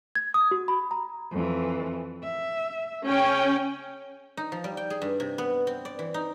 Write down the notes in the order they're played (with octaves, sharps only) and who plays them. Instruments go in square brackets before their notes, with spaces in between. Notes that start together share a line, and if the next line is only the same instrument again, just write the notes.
[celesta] G#6
D#6
F#4
B5
A#5
[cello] F2 E3
E5
[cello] C#3 [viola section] C#4 G5
[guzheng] D#4
F3
G3
G5
G#4
G2
C3
B3
C4
D5
E3
D#4